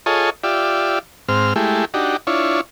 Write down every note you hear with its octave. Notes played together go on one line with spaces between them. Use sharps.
F4 G#4 A4 C#5 D#5
F4 G4 D5 E5
G#2 C4 F6
G#3 A3 E4 G4
D4 D#4 F#4 G4
D4 E4 F4 C#5